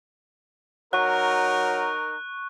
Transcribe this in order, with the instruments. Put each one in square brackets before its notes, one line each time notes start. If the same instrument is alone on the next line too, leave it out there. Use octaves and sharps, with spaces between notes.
[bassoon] F#3 [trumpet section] D#4 A#4 [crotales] C#6 F#6